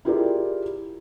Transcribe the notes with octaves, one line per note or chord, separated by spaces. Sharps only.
E4 F4 G4 G#4 A#4 D5